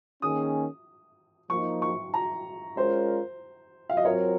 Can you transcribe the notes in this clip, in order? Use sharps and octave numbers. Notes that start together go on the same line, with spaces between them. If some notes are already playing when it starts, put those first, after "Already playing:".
D#3 A#3 C#4 G#4 D#6
F3 A#3 D#4 C#6
C#6
A#5
G#3 C#4 F4 A#4 C5
F5
D#5
F#3 C4 F4 A#4 C#5